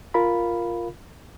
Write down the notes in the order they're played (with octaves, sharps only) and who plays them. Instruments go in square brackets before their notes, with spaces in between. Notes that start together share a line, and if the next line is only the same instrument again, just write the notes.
[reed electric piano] F4 A#4 F5 B5